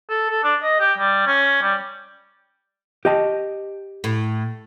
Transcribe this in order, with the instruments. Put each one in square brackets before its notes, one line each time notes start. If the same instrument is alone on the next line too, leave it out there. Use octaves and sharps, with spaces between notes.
[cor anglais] A4
A4
D4
D#5
G4
G3
C#4
G3
[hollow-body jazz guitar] G4 D#5 A5
[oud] A2